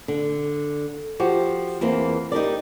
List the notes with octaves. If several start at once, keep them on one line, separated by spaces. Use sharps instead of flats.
D3
F3 F#4 G4
E2 E3 A#3 C4
D#4 G4 A#4 D5